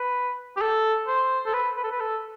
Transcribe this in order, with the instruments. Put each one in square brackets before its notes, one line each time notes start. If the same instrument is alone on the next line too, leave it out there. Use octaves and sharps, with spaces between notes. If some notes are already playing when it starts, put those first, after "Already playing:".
Already playing: [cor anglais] B4
G4
A4
C5
A4
B4
B4
A4
B4
A4